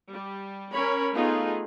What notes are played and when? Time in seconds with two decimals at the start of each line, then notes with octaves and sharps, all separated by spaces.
0.11 G3
0.72 C#4 A#4 C#5 B5
1.14 A3 B3 D#4 F4 G#4